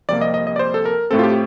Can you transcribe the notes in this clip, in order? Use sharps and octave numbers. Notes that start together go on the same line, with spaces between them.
F2 C3 G3 A#3 D5
D#5
D#5
D#5
D5
C5
A4
A#4
A2 A3 C4 A4
F4
G4